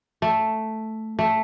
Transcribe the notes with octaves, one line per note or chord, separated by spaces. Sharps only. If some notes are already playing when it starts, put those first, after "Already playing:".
A3
A3